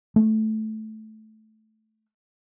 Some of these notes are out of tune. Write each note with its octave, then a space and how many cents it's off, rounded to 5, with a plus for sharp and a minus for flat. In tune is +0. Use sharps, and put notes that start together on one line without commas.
A3 -10